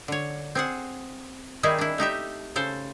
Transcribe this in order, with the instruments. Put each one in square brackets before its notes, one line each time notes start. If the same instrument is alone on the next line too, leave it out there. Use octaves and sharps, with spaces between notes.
[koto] D3 C#5
C4 G#4 F#5
D#3 G3 D#4 E4 G#4
D4 E4
A3 D#4 G4 E5
C#3 A4 C5